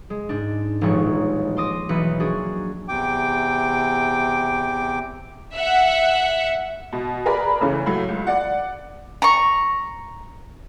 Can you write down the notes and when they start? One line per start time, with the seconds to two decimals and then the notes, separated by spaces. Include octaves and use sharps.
0.10 G#3
0.29 G#2 D4
0.81 D#1 A1 F3 G#3 C#5
1.57 C6 D6 D#6 A#6
1.89 B1 E3 B4 C#7
2.20 A#3 D4 F#4 G#4
2.88 E2 C3 G5 D6
5.55 E5 F#5
6.92 B2
7.25 G#4 A#4 B4 D5 B5
7.61 C#3 E3 A3 C#4
7.86 A2 F#3 A3
8.09 C#2
8.27 D5 F#5
9.22 A#5 C#6